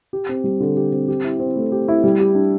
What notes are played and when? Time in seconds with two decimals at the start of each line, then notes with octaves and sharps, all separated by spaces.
0.13 G4
0.29 C4
0.44 G3
0.60 D3
0.77 G4
0.93 C4
1.08 G4
1.24 E4
1.39 C4
1.56 A3
1.72 G4
1.88 E4
2.04 G3
2.20 G4
2.35 D4